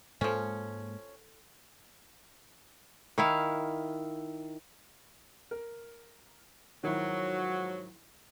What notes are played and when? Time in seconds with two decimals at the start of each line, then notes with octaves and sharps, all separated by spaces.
0.21 G#2 F3 G#3 A#3 C#4 A4
3.18 D#3 E4 F5
5.51 A#4
6.84 G#2 D#3 F3 F#3 E4